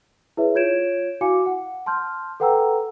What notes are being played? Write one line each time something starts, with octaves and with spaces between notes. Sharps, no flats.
E4 G#4 B4 C#5 E5
F4 C#5 G6 G#6 D7 E7
E4 F#4 F5 G#5 D6 C#7
F#5
A5 C6 F6 G6
A4 B4 F#5 G5 A#5 E6